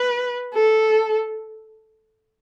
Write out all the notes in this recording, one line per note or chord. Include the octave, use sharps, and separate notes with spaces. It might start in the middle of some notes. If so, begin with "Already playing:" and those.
Already playing: B4
A4